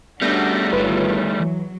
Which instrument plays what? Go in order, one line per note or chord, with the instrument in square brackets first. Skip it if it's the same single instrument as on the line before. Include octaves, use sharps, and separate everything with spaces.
[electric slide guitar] G3 A3 [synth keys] B3 G6 A#6 [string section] C#4 D4 F#4
[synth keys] G1 F4 B4 [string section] E2 D#3 C#5
[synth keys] E3 [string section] F#3